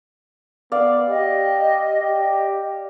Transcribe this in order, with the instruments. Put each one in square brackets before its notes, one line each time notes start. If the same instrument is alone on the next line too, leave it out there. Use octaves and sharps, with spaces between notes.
[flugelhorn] B3 [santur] D5 F5
[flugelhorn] G4 [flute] D#5
[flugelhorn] G4